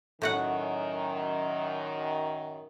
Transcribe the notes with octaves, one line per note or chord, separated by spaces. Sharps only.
F#2 A2 D#3 F#4 F#5